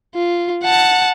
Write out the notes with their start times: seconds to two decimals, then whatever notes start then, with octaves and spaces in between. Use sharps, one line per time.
0.15 F4
0.64 F#5 A5